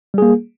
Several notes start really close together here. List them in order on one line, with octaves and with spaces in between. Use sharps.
G3 G#4 A#3